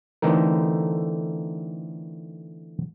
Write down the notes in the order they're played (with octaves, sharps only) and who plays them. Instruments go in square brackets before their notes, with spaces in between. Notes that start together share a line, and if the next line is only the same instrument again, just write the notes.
[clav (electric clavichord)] D3 E3 A3 C4 D#4 A#4